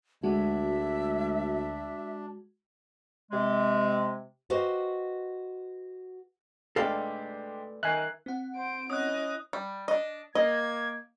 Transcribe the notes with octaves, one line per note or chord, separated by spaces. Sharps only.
D2 G#3 D4 F#4 E5
C3 G#3
F#4 G4 B4 C5 D#5 F5
G#3 A3 D4 G4 A4 B4 D5 F5
D#3 A#4 E5 G#5 F#6 C7
C4 F#5
C5 D7
C#4 E4 D#5 D#6 F#6
G3
D4 D#5
A#3 D#5 G#6